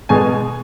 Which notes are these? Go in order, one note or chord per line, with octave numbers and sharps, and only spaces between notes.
B2 G#3 G#5